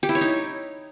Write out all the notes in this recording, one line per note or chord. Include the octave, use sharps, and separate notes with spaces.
G4
E4
C#5
D#4